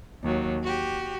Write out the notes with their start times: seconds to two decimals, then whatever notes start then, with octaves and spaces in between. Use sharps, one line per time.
0.23 D#2 F#3
0.62 F#4 G4